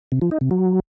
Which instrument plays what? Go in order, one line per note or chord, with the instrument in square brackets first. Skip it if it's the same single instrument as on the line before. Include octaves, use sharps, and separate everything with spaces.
[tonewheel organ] C3
F3
D#4
C3
F#3